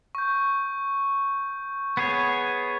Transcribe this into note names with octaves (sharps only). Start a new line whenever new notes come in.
C#6 G6
B3 G#4 C#5